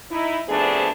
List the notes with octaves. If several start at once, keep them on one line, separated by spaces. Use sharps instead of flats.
D#4 E4
C3 F3 A3 B3 D4 G#4